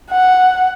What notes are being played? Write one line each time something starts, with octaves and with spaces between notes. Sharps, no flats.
F#5